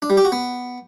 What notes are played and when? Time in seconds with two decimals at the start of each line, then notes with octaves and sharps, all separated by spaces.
0.02 D4
0.10 G3
0.17 G4
0.25 F#4
0.32 B3